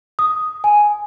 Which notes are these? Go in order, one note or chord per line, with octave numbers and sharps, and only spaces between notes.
D#6
G#5